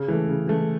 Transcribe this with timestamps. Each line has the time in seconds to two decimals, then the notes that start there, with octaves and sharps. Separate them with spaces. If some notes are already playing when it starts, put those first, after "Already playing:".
Already playing: C#3
0.08 E3 A3
0.28 C#3
0.47 E3 A3